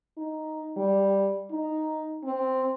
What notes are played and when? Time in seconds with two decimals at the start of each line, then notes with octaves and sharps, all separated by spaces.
0.17 D#4
0.77 G3
1.51 D#4
2.24 C4